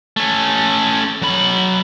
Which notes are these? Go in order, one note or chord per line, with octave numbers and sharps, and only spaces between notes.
A3 C#4
F#3 B5